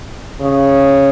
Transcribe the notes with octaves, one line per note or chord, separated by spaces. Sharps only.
C#3